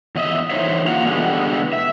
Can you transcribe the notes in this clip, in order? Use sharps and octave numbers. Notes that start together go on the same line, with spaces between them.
E2 D#5 E5
E3 A3 D#4 C5 C#5 E5
A#3 F4 F#4 F5 F#5 A#5
B2 D3 E3 G3 G#3 B3
E5